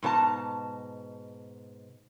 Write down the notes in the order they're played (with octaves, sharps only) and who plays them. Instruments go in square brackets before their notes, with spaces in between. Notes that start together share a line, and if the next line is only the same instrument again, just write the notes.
[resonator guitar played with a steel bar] G#2 B2 C5 A5 A#5